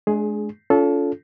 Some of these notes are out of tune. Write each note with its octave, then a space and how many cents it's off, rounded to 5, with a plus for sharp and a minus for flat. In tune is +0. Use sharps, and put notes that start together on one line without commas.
G#3 +35 D4 +0 G#4 +10
C#4 +40 F4 +0 A4 -15